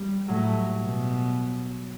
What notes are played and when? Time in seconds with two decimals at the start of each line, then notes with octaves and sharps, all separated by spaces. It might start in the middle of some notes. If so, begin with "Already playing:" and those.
Already playing: G3
0.28 A2 F#3
0.81 B2